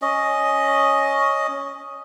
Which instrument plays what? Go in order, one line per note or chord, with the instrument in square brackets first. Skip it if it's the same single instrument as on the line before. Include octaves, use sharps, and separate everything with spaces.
[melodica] C#4 D#5